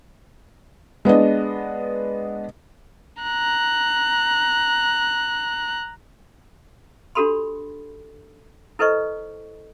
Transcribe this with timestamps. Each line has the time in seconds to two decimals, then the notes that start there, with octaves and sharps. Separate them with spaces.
1.05 G#3 B3 D4 D#5
3.22 A#5 F#6
7.15 D4 F#4 G4 A4 B5 C6
8.79 E4 A4 B4 C5 D#5 C#6